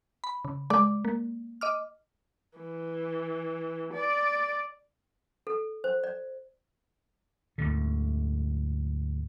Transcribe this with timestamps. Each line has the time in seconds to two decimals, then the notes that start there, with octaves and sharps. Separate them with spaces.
0.24 B5
0.45 C#3
0.70 G#3 D5
1.05 A#3
1.61 D#5 D6 F6
2.58 E3
3.93 D5
5.47 A4
5.84 C5
6.04 D5
7.58 D2 G#2 D3